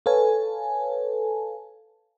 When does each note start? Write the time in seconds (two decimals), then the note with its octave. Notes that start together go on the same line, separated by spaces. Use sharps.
0.06 A4 B4 C#5 F5 G#5 A5